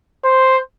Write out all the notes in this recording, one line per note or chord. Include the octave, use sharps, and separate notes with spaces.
C5